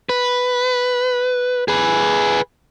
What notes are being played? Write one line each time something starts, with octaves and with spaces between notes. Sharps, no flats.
B4
G#4 B4